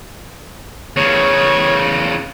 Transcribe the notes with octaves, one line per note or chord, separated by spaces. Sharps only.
E2 C#3 C#5